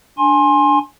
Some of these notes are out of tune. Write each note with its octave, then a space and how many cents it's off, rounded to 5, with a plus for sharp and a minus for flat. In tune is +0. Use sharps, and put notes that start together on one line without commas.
D4 +0 G#5 +0 C6 +25